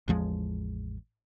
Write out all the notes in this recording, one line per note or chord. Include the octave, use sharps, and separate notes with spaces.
A1 E2 F3 G#3